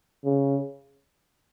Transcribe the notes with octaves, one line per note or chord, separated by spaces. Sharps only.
C#3